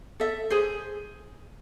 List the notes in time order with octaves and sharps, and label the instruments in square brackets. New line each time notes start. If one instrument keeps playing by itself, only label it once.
[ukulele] A4 E5
G#4 C5